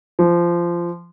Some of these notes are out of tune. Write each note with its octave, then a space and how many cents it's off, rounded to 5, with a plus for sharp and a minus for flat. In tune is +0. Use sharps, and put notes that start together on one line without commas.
F3 -20